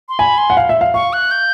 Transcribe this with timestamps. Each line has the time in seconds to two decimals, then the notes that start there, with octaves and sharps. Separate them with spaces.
0.09 C6
0.19 G#5 B5
0.38 C6
0.50 F#5
0.57 F5
0.69 E5
0.81 F5
0.94 F5 C#6
1.13 F#6
1.31 G6